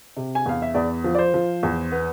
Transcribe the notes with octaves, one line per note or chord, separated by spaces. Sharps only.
C3
G#5
E2 F5
E5
E2 D5
F3
D5
C5
F3
E2
B3